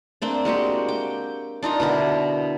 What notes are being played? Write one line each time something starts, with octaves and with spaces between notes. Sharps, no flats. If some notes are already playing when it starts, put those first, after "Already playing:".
A#3 C4 D4
G#3 A#3 F#4 G4
G5
D4 D#4 F4 A#5
B2 D3 E4 A#4